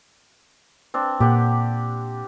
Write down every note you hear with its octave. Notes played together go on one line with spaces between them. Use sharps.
C4 D4
A#2 G4 F#5